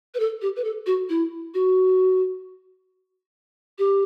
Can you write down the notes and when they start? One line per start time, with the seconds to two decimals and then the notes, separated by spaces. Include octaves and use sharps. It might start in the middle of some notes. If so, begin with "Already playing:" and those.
0.14 B4
0.20 A4
0.42 G4
0.56 B4
0.64 A4
0.86 F#4
1.09 E4
1.54 F#4
3.79 G4